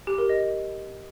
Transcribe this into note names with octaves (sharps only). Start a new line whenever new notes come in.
G4
A#4
D#5